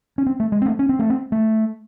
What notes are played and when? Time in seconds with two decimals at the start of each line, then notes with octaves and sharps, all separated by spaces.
0.18 C#4
0.26 C4
0.40 A3
0.52 G#3
0.62 C4
0.66 A3
0.79 C#4
0.89 C4
0.99 A3
1.10 C4
1.32 A3